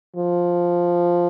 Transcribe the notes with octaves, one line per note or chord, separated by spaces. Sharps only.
F3